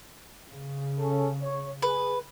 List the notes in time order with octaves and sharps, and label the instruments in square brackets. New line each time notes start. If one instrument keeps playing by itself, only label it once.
[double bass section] C#3
[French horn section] C#4 A4
C#5
[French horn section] G#4 [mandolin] B4